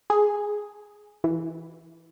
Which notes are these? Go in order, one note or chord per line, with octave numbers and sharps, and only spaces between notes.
G#4
E3